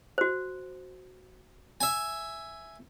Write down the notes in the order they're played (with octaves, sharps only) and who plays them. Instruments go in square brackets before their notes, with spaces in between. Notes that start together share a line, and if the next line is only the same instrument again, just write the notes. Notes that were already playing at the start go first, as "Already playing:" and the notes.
[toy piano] F#4 C5
[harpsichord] E5 G#5